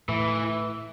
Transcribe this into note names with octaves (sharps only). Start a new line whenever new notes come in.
A2 E3